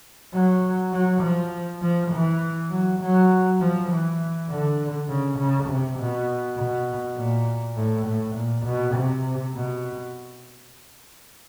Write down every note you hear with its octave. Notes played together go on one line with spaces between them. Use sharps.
F#3
F#3
F3
F3
E3
F#3
F#3
F3
E3
D3
C#3
C#3
C3
B2
B2
A#2
A2
A2
A#2
B2
C3
B2